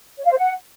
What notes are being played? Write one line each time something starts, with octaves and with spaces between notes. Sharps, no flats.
C#5
F5
C5
F#5